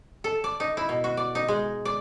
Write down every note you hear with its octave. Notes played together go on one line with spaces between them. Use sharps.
A4
D5
D#4
E4
B2
F#4
D5
D#4
G#3
D5